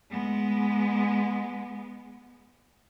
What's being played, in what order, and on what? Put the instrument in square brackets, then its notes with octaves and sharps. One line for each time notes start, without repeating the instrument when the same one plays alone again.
[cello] G#3 B3